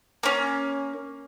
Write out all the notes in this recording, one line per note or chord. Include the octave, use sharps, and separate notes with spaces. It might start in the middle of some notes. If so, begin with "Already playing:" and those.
A#3 C#4